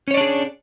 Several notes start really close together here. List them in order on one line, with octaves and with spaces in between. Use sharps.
C#4 C#5 D5 D4 G#4